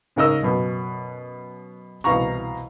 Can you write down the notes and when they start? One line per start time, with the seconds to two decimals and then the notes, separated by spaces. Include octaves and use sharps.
0.16 G#2 C#3 A#4 D#5 E6
0.43 F#2 B2
2.04 C2 B2 E3 F5 A#5 C#6